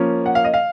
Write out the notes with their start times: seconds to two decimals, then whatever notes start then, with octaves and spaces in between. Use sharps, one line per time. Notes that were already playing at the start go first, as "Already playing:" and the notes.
Already playing: F3 A#3 C#4
0.26 F#5
0.35 F5
0.45 D#5
0.54 F5